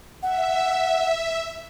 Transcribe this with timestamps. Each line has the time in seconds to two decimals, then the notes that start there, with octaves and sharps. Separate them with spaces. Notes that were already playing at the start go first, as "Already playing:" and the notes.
0.23 E5 F#5